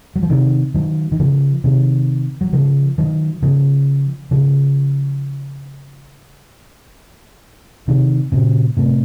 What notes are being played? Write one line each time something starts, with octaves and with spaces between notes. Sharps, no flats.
F#3
F3
C3 D#3
D#3 F#3
D#3
C#3 F3
C3 D#3
F#3
C#3 F3
D#3 F#3
C#3 F3
C#3 F3
C3 D#3
A#2 C#3
A2 C3